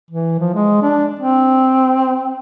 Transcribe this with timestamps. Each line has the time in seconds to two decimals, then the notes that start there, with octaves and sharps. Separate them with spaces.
0.11 E3
0.40 F3
0.54 G#3
0.82 D4
1.19 C4